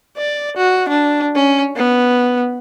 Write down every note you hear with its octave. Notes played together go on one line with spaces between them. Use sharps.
D5
F#4
D4
C#4
B3